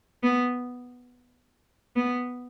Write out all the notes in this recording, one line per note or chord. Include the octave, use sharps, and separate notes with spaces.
B3
B3